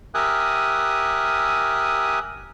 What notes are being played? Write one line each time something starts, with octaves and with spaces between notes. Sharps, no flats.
G4 A#4 E5 G#5 D#6 F#6